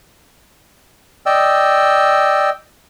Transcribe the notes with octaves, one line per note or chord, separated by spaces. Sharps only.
D5 D#5 G5 E6